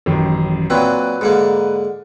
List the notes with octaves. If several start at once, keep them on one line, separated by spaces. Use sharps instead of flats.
A1 F#2 D#3
A#2 F#3 C4 B4 D5
G#2 D3 A#3